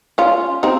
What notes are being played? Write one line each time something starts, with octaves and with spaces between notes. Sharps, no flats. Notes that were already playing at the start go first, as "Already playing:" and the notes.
C#4 F4
C4 D#4